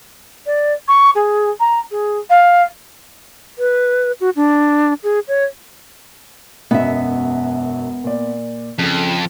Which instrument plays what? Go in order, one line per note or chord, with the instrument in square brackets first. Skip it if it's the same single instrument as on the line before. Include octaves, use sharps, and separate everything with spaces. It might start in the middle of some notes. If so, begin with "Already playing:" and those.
[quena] D5
C#6
G#4
A#5
G#4
F5
[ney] B4
F#4
D4
G#4
C#5
[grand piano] E1 F#2 D#5 [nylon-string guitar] B3 E5
[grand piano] A#2 D5
[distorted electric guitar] F2 [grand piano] C#3 A4